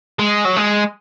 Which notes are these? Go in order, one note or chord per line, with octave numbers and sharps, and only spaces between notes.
G#3
F#3
G#3